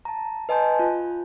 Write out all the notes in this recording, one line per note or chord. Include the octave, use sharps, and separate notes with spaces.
A5 A#5
B4 D#5 G#5 A5 C6 G6
F4